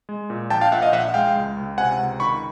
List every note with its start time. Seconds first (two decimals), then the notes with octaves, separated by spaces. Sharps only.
0.09 G#3
0.30 A#2
0.50 A#1 G5 A5
0.61 F5 G5
0.72 A#2 E5 F#5
0.82 D#5 F5
0.93 A#1 E5 F#5
1.14 G#3 F5 G5
1.35 C#2
1.57 C#2
1.78 C3 F#5 G#5
1.98 C#2
2.20 D#3 B5 C#6